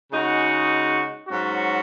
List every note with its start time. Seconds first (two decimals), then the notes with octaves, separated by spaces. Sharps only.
0.12 C#3 G#3 D#4 F#4
1.28 G#2 F#3 C#4 F#4